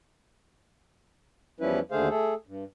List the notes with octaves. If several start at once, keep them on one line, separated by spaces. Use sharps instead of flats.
E2 F3 G3 C#4 E4 B4
D#2 D3 A3 G#4 C5 F5
A3 G#4 A4
G2